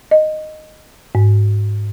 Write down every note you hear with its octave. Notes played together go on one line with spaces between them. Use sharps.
D#5
G#2